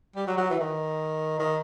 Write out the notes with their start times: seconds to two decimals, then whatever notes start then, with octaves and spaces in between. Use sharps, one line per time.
0.16 G3
0.27 F#3
0.38 F#3
0.50 E3
0.60 D#3
1.39 D#3